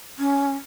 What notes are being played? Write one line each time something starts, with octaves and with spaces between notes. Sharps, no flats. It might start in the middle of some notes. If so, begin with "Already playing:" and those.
C#4